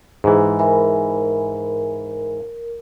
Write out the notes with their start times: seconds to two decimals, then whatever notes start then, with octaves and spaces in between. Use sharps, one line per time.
0.24 G#2 E3 G#4
0.59 A#4 E5 G#5 B5